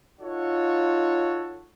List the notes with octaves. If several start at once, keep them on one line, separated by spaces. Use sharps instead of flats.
D#4 F4 F#4 A4 C#5